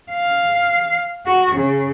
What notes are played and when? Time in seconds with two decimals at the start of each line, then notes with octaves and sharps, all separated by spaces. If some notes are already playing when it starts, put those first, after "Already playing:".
0.12 F5
1.26 F#4
1.55 C#3